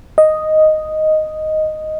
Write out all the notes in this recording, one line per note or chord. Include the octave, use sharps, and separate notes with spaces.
D#5